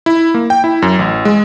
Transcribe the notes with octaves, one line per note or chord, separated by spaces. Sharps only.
E4
A#3
G5
E4
F#2
A1
G#3